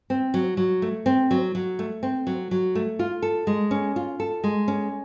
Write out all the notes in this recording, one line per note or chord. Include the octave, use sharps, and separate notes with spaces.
C4
F#3
F#3
A3
C4
F#3
F#3
A3
C4
F#3
F#3
A3
F4
A4
G#3
C#4
F4
A4
G#3
C#4